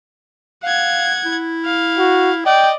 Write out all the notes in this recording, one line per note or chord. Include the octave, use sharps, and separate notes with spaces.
F5 F#5 G#6
E4
F5
F#4
D5 D#5 G5